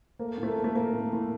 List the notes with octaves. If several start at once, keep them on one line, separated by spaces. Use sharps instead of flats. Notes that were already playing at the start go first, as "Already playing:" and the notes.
A3 A#3
A2
A3
A#3
A2
A3
A3 A#3
A2
A2